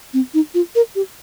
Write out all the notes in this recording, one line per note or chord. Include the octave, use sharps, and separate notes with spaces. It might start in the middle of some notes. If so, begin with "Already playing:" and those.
C4
D#4
F4
A#4
G4